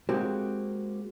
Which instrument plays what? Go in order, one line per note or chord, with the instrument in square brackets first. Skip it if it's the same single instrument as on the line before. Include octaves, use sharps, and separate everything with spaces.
[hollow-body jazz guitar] G#3 A#3 C4 F#4 G4